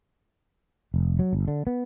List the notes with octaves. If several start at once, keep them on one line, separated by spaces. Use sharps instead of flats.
F1
F#3
G1
D3
B3